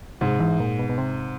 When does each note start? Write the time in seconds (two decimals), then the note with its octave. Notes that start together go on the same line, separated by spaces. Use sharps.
0.21 G#2 C3
0.40 E3
0.60 A#2
0.79 B2
0.89 B2
0.98 C3